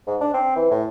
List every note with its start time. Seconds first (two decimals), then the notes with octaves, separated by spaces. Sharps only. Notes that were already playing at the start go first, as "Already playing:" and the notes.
0.07 G#2
0.21 D4
0.34 C4
0.56 E3
0.71 A2